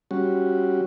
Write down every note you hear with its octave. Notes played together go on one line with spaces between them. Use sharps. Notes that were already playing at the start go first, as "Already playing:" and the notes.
G3 C#4 F#4